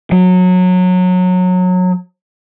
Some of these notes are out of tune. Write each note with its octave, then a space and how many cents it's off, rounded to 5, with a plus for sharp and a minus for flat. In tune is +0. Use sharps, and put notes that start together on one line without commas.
F#3 -20